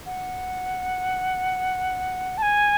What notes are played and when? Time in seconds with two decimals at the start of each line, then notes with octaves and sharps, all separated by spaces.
0.06 F#5
2.38 A5
2.42 G#5